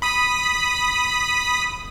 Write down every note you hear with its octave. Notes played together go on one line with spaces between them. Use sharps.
B5 D#6 B6